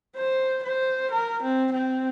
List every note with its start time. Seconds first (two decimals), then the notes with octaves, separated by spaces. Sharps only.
0.16 C5
0.63 C5
1.11 A#4
1.42 C4
1.73 C4